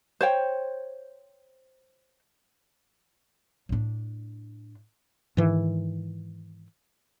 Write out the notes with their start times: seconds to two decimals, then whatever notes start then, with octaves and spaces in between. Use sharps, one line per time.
0.21 C5 C#5 G5
3.69 A2 D4
5.37 G#2 D#3 E3